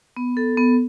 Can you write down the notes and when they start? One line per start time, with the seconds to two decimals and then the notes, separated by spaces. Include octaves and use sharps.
0.17 B3
0.37 A4
0.57 B3